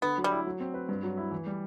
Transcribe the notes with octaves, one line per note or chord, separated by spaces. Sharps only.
D3 B3
F#3
G3
E4
F#3
C4
B4
G2
F#3
E4
E3
G3